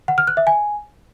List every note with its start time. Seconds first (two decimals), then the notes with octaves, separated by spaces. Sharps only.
0.08 F#5
0.18 F6
0.27 F#6
0.37 E5
0.47 G#5